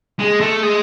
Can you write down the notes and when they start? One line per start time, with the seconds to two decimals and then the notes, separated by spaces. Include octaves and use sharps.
0.19 G#3
0.41 A3
0.63 G#3